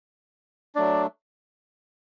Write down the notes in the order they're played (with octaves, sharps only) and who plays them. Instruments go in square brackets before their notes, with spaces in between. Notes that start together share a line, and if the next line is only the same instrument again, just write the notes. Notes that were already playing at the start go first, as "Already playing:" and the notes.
[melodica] F#3 A3 D4 D5